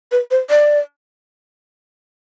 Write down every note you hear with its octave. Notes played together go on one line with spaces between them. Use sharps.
B4
C5
D5